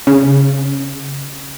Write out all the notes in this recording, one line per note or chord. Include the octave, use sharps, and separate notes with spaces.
C#3